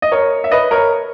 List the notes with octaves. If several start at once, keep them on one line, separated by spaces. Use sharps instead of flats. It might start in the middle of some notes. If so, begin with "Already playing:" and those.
D#5
A#4 C#5
E5
B4 D#5
A#4 C#5